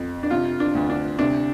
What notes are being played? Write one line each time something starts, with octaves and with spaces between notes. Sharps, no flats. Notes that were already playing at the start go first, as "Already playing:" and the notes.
Already playing: F2
D4
C3 F4
D4
D2
D4
C3 D4